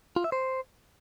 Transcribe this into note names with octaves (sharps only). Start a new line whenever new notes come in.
F4
E5
C5